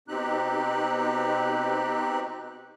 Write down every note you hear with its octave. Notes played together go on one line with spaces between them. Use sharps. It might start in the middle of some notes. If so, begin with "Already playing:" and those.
B2 C4 D#4 G4 F#6